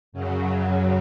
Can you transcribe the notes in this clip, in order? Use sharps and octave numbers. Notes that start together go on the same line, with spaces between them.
F#2 C#3 F#3